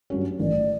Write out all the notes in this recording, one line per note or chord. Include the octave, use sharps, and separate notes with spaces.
G2 F#3 C#4
A1 D5